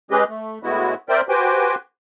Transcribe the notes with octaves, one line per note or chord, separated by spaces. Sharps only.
G#3 C#4 G4 G#4 B4 D#5
A3
A2 G#3 B3 E4 F#4
C4 A#4 C5 D5 E5 G5
F#4 G4 B4 C5 G5 G#5